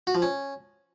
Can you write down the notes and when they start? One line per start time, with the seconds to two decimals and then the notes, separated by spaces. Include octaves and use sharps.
0.07 F#4
0.15 F3
0.22 C#4